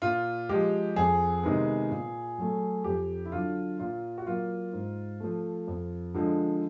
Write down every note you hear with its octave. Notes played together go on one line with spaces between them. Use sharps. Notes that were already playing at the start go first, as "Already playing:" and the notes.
A#2 F4
F3 G#3 G4
F2 G#4
C3 D#3 G#3 B3
A#2
F#3 A3
F2 G4
E4
D3 F#3 F4
A#2 F4
F#4
F#3 A#3 F4
G#2
F3 A3
F2
D3 F3 G#3